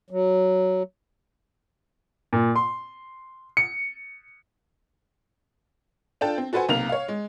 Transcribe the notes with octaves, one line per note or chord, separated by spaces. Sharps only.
F#3
A#2
C6
C#7
D4 F4 A4 G5 A5
C4
F#4 A4 B4 C5 F#5 G#5
B1 C3 A#3 A#4 F5 F7
C#5 F5
G#3